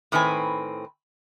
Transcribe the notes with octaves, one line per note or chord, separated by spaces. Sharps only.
A2 D#3 C4 B4 G#5